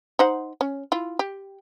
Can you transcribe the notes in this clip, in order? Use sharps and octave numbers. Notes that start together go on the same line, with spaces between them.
D#4 C5 F#5
C#4
E4 F4
G4